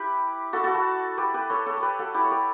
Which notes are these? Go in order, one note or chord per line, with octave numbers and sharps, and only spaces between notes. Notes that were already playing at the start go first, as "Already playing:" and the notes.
Already playing: E4 G4 B4
F#4 A4
F#4 A4
F#4 A4
G4 B4
G4 B4
A4 C#5
A4 C#5
A4
G4 B4
F#4 A4
E4 G4
C#5
G4 B4